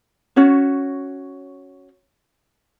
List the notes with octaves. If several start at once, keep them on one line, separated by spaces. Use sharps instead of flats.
C#4 F#4 C#5